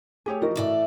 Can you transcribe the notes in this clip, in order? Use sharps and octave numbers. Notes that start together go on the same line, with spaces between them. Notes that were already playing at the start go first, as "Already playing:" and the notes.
A3 G4 G#4 C#5
E3 F3 D#4 F#4 A#4 D#5
A2 E3 A4 D5 E5